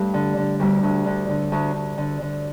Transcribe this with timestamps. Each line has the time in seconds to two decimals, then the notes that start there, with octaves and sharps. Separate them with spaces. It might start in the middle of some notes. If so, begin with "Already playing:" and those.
Already playing: G2 A3
0.14 D3
0.37 D3
0.60 D2 G3
0.83 D2
1.06 D3
1.29 D3
1.52 D2
1.75 D2
1.98 D3
2.22 D3